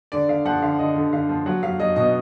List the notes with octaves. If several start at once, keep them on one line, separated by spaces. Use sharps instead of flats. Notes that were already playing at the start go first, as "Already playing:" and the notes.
D3 D5
D3 F5
F3 F#5
D3 F5
D3 D#5
D3
D3 F5
F3
F#3 F#5
F#3 F5
F#3 D#5
B2 D#5